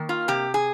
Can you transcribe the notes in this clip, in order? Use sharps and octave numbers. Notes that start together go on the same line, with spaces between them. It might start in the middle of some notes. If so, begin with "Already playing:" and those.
Already playing: D#3 A#3
F4
C3 G4
G#4